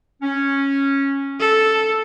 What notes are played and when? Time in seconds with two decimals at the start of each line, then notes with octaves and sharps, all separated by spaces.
0.22 C#4
1.40 A4